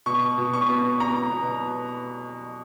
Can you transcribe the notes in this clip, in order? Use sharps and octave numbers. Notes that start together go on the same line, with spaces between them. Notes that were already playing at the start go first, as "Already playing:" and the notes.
B2 C#6
B2
C#6
B3
B3 A#5
B2